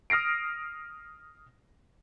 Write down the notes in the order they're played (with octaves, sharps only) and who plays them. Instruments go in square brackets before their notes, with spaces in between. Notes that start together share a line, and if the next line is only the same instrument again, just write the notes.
[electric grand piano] D#6 F6 A#6 C7 D7